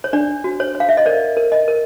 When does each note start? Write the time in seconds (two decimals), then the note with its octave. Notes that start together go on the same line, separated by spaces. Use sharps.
0.04 C#5
0.13 D4 D5
0.44 F#4
0.60 C#5
0.75 C#5
0.80 F5
0.89 E5
0.97 D#5
1.06 A#4 D5
1.37 A#4
1.52 D#5
1.68 A#4